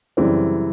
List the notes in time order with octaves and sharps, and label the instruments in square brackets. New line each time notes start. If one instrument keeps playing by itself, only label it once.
[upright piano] F#2 C#3 E3 G3 C4